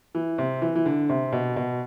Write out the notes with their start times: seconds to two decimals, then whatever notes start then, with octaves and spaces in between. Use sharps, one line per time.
0.15 E3
0.38 C3
0.62 E3
0.75 E3
0.86 D3
1.09 C3
1.32 B2
1.56 B2